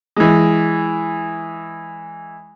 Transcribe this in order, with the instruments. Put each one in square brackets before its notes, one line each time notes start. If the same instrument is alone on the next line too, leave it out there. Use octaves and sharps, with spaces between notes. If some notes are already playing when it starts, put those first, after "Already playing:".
[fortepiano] E3 G#3